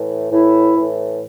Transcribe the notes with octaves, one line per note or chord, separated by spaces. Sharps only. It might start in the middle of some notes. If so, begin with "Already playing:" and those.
Already playing: A2 E3
A2 E3 E4
A2 E3